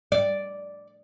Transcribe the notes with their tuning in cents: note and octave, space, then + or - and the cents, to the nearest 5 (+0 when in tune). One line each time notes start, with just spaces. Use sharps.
D5 -5